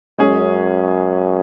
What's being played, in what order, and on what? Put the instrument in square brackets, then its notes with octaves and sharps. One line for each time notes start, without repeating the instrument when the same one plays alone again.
[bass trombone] F#2 [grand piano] G#3 C#4 G#4